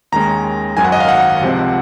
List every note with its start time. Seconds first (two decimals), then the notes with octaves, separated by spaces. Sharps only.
0.12 D#2 D#3 G#3 C#4 A#5
0.76 G#1 F#2 D#3 F#3 G#5
0.84 F#5
0.92 D#5
1.00 F5
1.09 F#5
1.41 C#2 C3 F3 C4